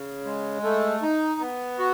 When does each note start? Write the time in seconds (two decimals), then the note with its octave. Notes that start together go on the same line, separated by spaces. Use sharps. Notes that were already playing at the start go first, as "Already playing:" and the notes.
Already playing: C#3
0.25 G#3
0.63 A3
1.02 D#4
1.41 B3
1.79 F#4